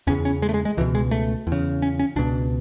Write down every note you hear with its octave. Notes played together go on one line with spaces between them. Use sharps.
E2 C#3 C#4
C#4
G#3
A3
G#3
G#3
C#2 B2 E3
G#3
A3
E2
C#3
C#4
C#4
C#2 B2 D4